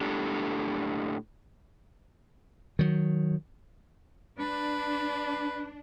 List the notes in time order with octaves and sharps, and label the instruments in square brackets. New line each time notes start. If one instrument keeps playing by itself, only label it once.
[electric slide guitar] A2 D4 G4 A4
[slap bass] D#3 F#3
[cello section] D4 [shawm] B4